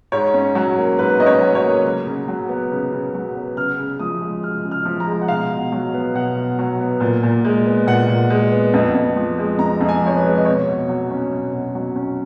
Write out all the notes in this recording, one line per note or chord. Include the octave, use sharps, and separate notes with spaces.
G#2 C#5
C#4
F#3
A#3
G#2 B4
C#4 D#5
C#5
F#3
C#5
A#3
C#3
C#3
F#3
B3
C#3
C#3
F#3
B3
C#3 F6
C#3
F3 D#6
G#3
C#3 F6
C#3
F6
F3
A#5
G#3
F#5
B2 F5
B2
F#3
B3
B2 F#5
B2
F#3
B3
A#2
A#2
G#3
B3
A#2 F#5
A#2
G#3
B3
F2
F2
F3
G#3
F2 A#5
F2
G#5
F3 C#5
B4
G#3
D#5
B2 C#5
B2
F#3
C#4
B2
B2
F#3
C#4